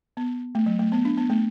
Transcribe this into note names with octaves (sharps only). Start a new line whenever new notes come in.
B3
A3
F#3
A3
B3
D4
B3
A3